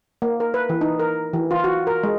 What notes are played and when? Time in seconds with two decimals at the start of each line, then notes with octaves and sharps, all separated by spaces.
0.22 A#3
0.40 A#4
0.54 B4
0.69 E3
0.81 D#4
1.00 A#4
1.33 E3
1.51 F4
1.64 F#4
1.87 A#4
2.03 G#3